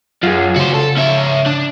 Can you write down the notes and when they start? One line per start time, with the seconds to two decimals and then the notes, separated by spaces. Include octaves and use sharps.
0.23 F#2 F4 G#4
0.56 C#3 F#4 C5
0.74 A4
0.97 C#4 E5
1.46 D4